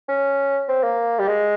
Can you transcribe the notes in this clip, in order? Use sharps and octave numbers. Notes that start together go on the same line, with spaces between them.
C#4
C4
A#3
G3
G#3